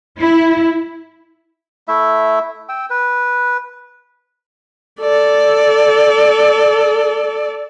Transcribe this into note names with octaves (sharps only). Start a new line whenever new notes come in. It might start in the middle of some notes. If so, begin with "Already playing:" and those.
E4
A3 E4 E5
G5 E6
B4
A4 D5